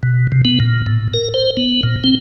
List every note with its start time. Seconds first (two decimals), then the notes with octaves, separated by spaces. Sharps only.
0.03 B2
0.32 C3
0.45 B3
0.60 A#2
0.86 A2
1.14 A#4
1.34 C5
1.57 B3
1.83 A#2
2.04 C4